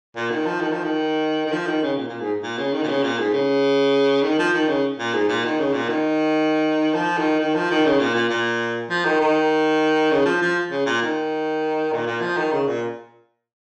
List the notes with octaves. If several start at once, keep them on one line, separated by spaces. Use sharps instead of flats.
A#2
D#3
F3
D#3
F3
D#3
D#3
F3
D#3
C#3
A#2
A#2
G#2
A#2
C#3
D#3
A#2
C#3
A#2
G#2
C#3
D#3
F3
D#3
C#3
A#2
G#2
A#2
D#3
C#3
A#2
D#3
F3
D#3
D#3
F3
D#3
C#3
A#2
A#2
A#2
F3
D#3
D#3
C#3
F3
F3
C#3
A#2
D#3
A#2
A#2
F3
D#3
C#3
A#2